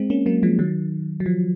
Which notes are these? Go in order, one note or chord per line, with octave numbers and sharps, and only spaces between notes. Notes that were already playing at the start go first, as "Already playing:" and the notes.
Already playing: G#3 C4
A#3 C#4
F#3 A#3
F3 G#3
D#3 F#3
F#3
F3